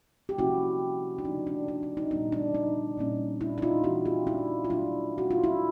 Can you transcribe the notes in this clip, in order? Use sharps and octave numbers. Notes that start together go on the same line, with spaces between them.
G4
C3 F3 A#3 C#4 E4 F#4
D4
C#3 F3 A3 D#4
D4
D4
D4
D#4
A#2 G3 B3 D#4
D4
D#4
A#2 G3 A#3 C#4
D4 E4
E4
D#4 F4
E3 A3 D4 E4 F#4
F4 G4
D4 E4
F4
B2 F#3 A3 D4 E4
F#4
F4
E4